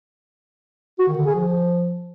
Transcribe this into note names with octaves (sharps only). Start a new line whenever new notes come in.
F#4
D#3
D3
G#4
F3